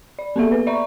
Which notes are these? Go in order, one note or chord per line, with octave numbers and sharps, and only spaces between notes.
D5
A#3 B3 A4 E5
B4
D5 E5 A#5 C#6